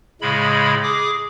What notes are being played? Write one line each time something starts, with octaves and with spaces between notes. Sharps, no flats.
A2 C#3 G#3 B5
G#4 D6